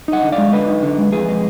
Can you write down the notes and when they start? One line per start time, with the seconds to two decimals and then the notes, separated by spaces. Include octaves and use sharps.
0.08 D#4 D#5 F#5
0.22 D3
0.32 D5 F5
0.38 G#3
0.52 D3 B4 D#5
0.68 D#4
0.83 D3
0.98 G#3
1.12 F2 G#4 B4
1.28 G#3